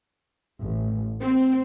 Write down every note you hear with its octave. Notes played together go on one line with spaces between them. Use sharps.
A1
C4